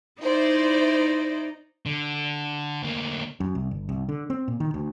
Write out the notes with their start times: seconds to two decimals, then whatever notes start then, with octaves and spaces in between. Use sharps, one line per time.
0.22 D#4 E4 C5 D5
1.86 D3
2.82 D2 A#3
3.40 F#2
3.55 C2
3.71 G1
3.89 C2
4.09 D3
4.30 C4
4.48 A#2
4.60 D#3
4.74 D2